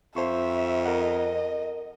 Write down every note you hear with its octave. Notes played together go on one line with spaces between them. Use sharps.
F2 C5 E5 C#6
A#4 D#5 F#5